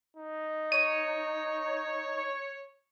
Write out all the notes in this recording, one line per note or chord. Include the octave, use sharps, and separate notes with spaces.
D#4
C#5 D#7